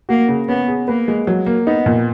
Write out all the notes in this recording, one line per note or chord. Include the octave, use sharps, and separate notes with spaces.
A#3 F#4
C#3
B3 C#4
G#4
A#3 B4
G#3
F#3
A#3
B3 D#4
A#2